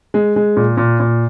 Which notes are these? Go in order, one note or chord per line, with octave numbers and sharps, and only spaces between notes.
G#3
G#3
A#2
A#2
A#2